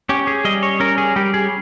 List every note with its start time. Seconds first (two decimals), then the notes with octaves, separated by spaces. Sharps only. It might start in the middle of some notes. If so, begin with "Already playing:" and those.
0.09 C#4 G4
0.27 G#4
0.45 G3 D#5
0.63 C#5
0.80 C#4 A#4
0.98 G#4
1.16 G3 G4
1.34 G#4